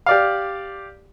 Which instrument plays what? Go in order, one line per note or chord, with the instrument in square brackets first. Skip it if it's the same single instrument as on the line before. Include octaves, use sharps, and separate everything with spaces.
[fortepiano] G4 D5 F5